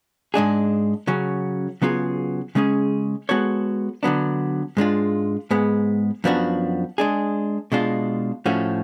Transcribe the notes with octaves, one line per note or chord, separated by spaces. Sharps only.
G#2 G#3 D4 G#4
C#3 F#3 C#4
C#3 F#3 B3 F4 G#4
C#3 G#3 C#4 G#4
G#3 B3 F#4 A4 C#5
D3 F#3 B3 D4
G#2 G#3 D4 F4
G#2 G#3 B3
F#2 F3 B3 D4 F#4
G#3 D4 G#4
B2 G#3 D4 F4
A2 F3 A3 C#4 F#4